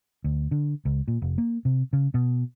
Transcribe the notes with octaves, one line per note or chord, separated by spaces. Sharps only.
D2
D3
C#2
A#2
F1
A#3
C3
C#3
B2